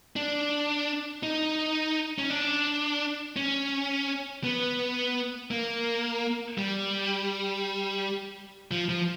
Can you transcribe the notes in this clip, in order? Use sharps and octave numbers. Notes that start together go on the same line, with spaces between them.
D4
D#4
C#4
D4
C#4
B3
A#3
G3
F3
F3